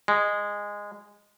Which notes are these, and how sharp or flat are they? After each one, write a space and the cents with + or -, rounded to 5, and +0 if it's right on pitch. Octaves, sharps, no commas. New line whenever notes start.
G#3 -15